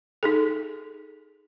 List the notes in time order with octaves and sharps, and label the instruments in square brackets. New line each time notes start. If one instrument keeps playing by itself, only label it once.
[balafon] D#4 G#4 A4